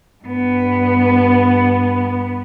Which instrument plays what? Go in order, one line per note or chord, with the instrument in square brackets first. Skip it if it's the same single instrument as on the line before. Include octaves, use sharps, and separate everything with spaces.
[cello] G2 B3